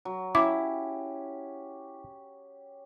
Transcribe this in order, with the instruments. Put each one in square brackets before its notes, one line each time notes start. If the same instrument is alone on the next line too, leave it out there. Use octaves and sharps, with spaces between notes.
[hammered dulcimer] F#3
[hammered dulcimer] C#4 G4 [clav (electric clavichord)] E4 [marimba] D6